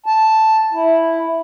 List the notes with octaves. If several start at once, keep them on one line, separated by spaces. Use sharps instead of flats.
A5
E4